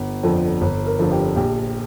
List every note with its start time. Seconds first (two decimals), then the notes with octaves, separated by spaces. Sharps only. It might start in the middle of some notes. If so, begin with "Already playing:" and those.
Already playing: G1
0.23 F2 D3 F3
0.61 G1
0.86 A#4
0.99 F2 D3 F3
1.12 G4
1.36 A#1 G4